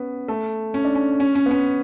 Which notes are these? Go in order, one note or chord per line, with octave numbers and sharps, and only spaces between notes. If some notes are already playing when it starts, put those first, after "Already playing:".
Already playing: B3 C#4
A3
C#4
D4
C#4
C#4
C#4
B3
C#4